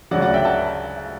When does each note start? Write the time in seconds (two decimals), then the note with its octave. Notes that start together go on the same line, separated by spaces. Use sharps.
0.11 D2 C#3 F#3 D5 F#5
0.22 D5 F#5
0.34 E5 G5
0.45 F#5 A5